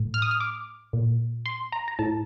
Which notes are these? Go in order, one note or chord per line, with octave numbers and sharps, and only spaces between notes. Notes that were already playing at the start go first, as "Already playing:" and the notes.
Already playing: A2
F6
D#6
F6
D6
A#2
C6
A#5
A#5
A2 A5